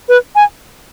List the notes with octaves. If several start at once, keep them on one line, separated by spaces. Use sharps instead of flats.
B4
G#5